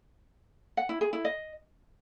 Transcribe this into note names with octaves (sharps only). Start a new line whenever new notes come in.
F#5
E4
G#4
E4
D#5